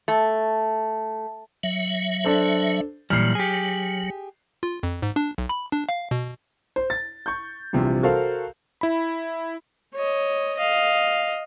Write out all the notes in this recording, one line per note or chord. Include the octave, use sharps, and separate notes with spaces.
A3
F#3 E5
D4 A4 C5
A#2 E3 F#3 G3 F6 C7
G4 G#4
F4
F2
G#2
D4
B1
B5
D4
F5
B2
C5
A6
C#6 G6
A#1 C3 E3 F3 G3
F#4 A4 A#4 C5 F5
E4 B5
C#5 D#5
D#5 F5